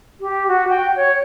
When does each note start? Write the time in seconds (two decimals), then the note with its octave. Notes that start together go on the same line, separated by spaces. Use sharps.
0.21 G4
0.48 F#4
0.68 G5
0.96 C#5